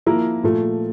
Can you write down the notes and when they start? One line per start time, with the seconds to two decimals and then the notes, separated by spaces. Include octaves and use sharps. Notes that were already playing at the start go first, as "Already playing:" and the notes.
0.06 F3 A#3 E4 A#4
0.43 A#2 F3 A3